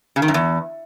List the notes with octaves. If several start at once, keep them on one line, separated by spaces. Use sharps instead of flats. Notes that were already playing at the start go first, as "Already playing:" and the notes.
C#3
D#3
F#2
E2